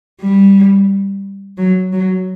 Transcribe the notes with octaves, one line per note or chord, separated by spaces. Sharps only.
G3
F#3
F#3